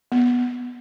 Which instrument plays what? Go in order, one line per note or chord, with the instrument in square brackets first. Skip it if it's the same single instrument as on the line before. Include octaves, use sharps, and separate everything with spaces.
[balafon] B3